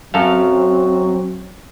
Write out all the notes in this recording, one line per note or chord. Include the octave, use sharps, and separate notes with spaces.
F#2 F#3 C4 F#4 A4 F5